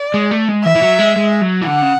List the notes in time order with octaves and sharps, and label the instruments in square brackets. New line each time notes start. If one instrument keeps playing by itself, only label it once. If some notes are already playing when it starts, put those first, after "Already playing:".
Already playing: [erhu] D5
[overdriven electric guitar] G#3
A3
G#3
[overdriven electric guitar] E3 [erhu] E5
[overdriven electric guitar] E3
F#3
G#3
G#3
F#3
E3
[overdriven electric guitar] D3 [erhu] F#5
[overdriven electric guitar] C#3